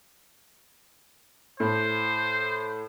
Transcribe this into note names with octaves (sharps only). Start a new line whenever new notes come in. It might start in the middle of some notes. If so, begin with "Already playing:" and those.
A2 C5